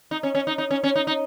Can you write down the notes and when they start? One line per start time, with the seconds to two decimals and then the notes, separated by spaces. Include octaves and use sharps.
0.11 D#4
0.23 C#4
0.35 C#4
0.47 D#4
0.58 D#4
0.71 C#4
0.84 C#4
0.96 D#4
1.07 D#4